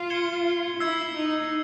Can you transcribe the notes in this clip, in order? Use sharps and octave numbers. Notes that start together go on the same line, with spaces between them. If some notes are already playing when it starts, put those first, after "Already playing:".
Already playing: F4
G#6 C#7 E7 G7
E4 E6 G#6 C7
D#4